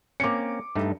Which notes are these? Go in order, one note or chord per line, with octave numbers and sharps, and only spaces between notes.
A#3 C4 C#4 D6 C#7
G2 A3 D#4